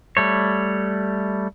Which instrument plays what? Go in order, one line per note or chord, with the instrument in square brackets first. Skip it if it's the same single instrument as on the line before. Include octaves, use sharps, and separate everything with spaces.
[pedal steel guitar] G3 A3 C#5